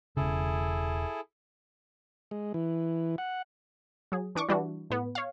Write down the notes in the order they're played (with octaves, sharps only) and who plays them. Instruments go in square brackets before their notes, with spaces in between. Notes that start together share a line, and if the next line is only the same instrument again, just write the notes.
[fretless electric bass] E1 C#3 [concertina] E4 G#4 A4
[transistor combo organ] G#3
E3
F#5
[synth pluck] F#3 G#4
E3 D4 C#6 D6
E3 G3 D4 E4 F#4
A2 B3
C#5 F5